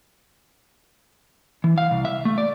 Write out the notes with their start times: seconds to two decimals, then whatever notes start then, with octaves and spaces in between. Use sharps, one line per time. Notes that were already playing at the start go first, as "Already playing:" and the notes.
1.64 E3
1.78 F5
1.91 C2
2.05 E5
2.25 A3
2.38 D5